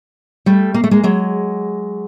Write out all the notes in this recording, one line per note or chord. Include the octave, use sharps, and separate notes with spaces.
G3 A3
A#3
A3
G#3 A#3
F#3 G#3